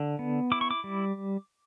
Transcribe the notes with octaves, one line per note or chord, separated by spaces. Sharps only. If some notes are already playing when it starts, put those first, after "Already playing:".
Already playing: D3
B3
E4 D6
C#6
D6
G3